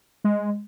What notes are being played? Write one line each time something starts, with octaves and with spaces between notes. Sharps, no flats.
G#3